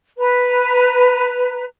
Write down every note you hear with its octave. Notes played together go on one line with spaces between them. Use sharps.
B4 A#5